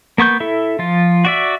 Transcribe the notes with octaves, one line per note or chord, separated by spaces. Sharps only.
A#3 B3 C#6 G6
E4 A4 E5
F3 F4
F#4 D5 E5